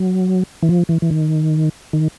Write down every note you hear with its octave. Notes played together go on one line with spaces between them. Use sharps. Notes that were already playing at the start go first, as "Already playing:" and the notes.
Already playing: F#3
E3
F3
E3
E3
D#3
D#3